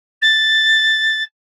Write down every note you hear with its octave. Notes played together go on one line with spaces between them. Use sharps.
A6